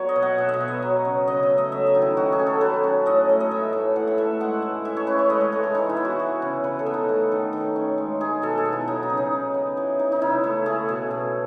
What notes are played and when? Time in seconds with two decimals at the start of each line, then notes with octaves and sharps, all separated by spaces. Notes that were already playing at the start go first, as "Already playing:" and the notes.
Already playing: F#3 B3 F#4 C#5
0.09 D#5
0.16 B2
0.23 F#5
0.38 B2 E5
0.49 D#5
0.54 E5
0.61 B3
0.68 D#5
0.82 F#3
1.05 C#3
1.27 C#3 D#5
1.43 E5
1.50 A3
1.58 D#5
1.72 F#3 E5
1.87 D#5
1.95 D#3
2.02 E4
2.17 D#3 F#4
2.32 G#4
2.39 C#4
2.46 A4
2.61 F#3 B4
2.84 C#4
3.06 A2 D#5
3.29 A3
3.40 D#5
3.51 E3 E5
3.73 A2
3.96 A2 F#5
4.07 E5
4.18 A3 E5
4.40 G#3 F#5
4.62 E3
4.85 E3 E5
4.97 C#5
5.07 C#4 B4
5.19 C#5
5.30 G#3 D#5
5.41 C#5
5.52 E3 A4
5.63 G#4
5.75 E3 D#4
5.89 E4
5.96 B3
6.05 F#4
6.20 E3
6.42 C#3
6.64 C#3 B4
6.79 A4
6.86 B3
6.94 D#4
7.09 A3
7.32 D#3
7.53 D#3
7.76 C#4
7.98 G#3
8.20 D#4 G#4
8.42 B2 A4
8.58 G#4
8.65 B3
8.72 E4
8.88 F#3 D#4
9.03 D#4
9.10 C#3
9.17 D#4
9.32 C#3
9.54 B3
9.77 E3
9.99 D#4
10.12 D#4
10.22 C#3 E4
10.44 A3 E4
10.66 A3 G#4
10.89 B2
11.11 B2